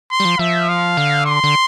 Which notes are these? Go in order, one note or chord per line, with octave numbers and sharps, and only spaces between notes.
C6
G3
F3
F3 E5
F5
D3
C6
D3